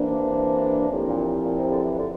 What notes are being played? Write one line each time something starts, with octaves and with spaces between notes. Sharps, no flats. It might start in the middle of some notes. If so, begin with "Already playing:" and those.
Already playing: C3 E3 A#3 D4
A2 F3 C4 E4 G4 A#4
A#2
A#2
C3
D3
E3
D3